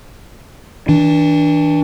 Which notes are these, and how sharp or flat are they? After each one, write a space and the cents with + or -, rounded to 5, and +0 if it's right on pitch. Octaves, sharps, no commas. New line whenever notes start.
E3 -40 D4 +0